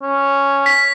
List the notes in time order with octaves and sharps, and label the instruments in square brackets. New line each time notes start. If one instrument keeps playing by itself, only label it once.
[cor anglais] C#4
[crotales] B6